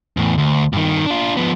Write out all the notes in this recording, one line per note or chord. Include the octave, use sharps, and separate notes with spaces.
E2 A2
D2
G2 D#3
D4 F4
F3 B3